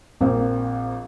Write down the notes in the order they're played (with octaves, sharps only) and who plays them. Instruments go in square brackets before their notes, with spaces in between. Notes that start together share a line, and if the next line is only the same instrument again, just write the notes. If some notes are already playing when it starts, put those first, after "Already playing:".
[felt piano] A#1 A#3 C4